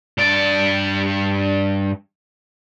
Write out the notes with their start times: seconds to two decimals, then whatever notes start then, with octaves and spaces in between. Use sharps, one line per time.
0.18 G2 D5